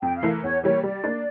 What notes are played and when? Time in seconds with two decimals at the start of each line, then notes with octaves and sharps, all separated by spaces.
0.02 F2 G5
0.16 F5
0.23 E3 A3 E4 A#4
0.43 E2 C#5
0.63 E3 G3 A#3 C#5
0.83 G3 D5
1.04 A#3 D4